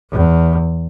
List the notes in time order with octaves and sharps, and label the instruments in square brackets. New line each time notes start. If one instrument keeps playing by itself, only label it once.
[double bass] E2